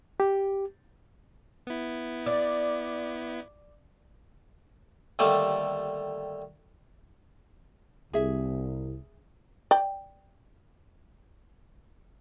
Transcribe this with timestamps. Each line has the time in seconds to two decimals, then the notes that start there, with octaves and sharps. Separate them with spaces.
0.20 G4
1.67 B3 E4
2.26 D5
5.19 D#2 D3 G3 A3
8.13 C2 G#4 E5
9.71 D5 G5